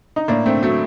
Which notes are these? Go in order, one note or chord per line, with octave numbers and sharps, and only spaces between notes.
D#4
A2 A#3 D4
A3 C4
F#3 A3